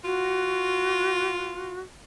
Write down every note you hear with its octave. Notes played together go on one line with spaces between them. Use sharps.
F4 F#4